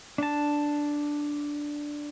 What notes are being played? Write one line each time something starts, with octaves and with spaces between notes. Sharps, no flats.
D4 A5